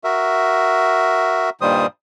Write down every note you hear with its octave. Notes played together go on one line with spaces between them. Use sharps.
F#4 A#4 E5
G2 A#2 D#3 G3 C5 D#6